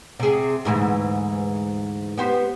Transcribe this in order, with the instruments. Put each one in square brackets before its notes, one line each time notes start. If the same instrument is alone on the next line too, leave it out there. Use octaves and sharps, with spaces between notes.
[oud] C3 G#4
D2 G#2 E3
B3 G4 C5